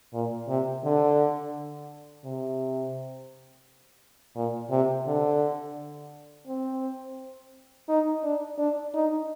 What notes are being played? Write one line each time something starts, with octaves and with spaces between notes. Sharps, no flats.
A#2
C3
D3
C3
A#2
C3
D3
C4
D#4
D4
D4
D#4